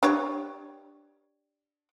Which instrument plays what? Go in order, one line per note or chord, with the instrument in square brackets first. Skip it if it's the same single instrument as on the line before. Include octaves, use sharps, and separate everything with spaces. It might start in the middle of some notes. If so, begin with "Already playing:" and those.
[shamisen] D4 G4 C#5